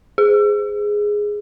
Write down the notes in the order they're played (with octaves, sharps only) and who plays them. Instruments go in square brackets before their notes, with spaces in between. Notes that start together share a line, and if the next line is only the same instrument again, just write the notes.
[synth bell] G#4